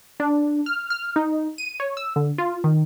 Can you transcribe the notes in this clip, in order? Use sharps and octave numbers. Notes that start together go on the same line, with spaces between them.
D4
F6
F6
D#4
D#7
C#5
E6
D3
F4
D#3